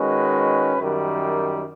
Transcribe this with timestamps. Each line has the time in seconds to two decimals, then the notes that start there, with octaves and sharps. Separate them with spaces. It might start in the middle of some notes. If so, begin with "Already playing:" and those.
Already playing: D#3 G#3 C#4 F#4 B4
0.78 F#2 D#3 G3